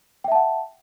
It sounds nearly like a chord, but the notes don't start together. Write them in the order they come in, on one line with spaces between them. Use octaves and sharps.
G5 E5 A5 F#5